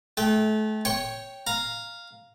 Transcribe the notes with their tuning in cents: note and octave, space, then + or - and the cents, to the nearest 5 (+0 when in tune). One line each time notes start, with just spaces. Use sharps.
A3 -30 G5 +0
C#5 +0 G5 +0 C#6 -10
F5 +0 A#5 +0